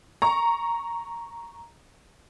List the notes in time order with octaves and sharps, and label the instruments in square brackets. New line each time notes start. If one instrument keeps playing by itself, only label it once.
[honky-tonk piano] A#5 C#6